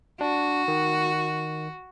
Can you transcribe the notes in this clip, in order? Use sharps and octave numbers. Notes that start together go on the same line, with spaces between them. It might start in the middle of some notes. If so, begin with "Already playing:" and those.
D4 F#4
D#3